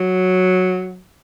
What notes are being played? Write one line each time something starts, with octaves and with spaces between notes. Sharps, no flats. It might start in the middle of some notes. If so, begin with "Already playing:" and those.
Already playing: F#3